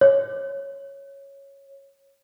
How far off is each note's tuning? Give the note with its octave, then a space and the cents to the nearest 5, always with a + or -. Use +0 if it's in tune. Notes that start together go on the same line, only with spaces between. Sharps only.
C#5 -5